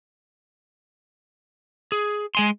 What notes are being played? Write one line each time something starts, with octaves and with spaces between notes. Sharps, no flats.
G#4
G#3 G#5 C6